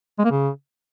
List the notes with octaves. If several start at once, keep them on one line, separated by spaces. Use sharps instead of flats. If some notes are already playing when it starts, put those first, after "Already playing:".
G#3
A#3
C#3